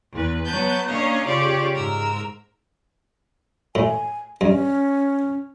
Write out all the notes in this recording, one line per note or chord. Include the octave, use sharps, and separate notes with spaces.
E2 B4
F#3 B3 B4 A5 G6
A#3 C#4 D4 C#5 D#5 F5
C#3 F4 G4 C#5 D5
G#2 A#4 E6
A2 G#5
G2 C#4